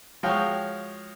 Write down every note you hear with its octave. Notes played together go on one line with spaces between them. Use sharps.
F3 G#3 F#4 C#5 F5 G5